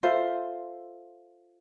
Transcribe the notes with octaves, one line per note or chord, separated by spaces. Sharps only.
F4 A4 C5 E5